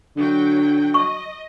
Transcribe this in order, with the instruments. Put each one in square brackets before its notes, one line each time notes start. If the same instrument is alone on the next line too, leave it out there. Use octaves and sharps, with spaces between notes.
[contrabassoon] D3 [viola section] F#3 G5
[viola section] D#5 [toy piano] C#6